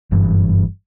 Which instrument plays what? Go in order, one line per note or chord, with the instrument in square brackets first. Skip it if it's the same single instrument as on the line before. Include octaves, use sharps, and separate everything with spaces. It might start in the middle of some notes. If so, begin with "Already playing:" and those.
[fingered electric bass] F#1 G2 E3